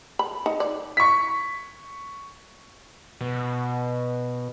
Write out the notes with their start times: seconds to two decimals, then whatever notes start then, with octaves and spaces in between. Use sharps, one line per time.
0.19 B5
0.46 D#4
0.60 D5
0.97 C#6 B6
3.21 B2